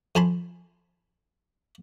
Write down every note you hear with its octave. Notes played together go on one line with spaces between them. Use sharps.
F2 G#5 A5 B5 C6